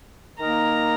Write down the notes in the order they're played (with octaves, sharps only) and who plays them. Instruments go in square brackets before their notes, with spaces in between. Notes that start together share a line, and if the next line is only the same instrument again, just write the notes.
[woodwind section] D#3 A#3 D#4 A#4 D#5 [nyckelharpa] A#5